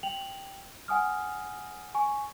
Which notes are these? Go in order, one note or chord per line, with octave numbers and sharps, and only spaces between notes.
G5 F7 F#7
F#5 G#5 D#6 F6
G#5 C#6